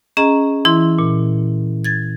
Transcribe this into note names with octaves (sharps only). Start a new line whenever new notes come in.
C#4 G#4 D#5 A#5
E3 E4 C6
A#2
G#6 A6